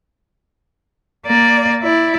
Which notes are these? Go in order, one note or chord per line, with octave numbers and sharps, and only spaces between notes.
A#3 D5
E4 D5